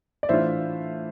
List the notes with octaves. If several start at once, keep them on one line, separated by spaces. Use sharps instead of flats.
D5
A2 E3 A3 D4 F4 C5 E5